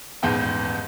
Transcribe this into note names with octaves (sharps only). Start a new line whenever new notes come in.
D#1 E2 G#2 B3 G5 A5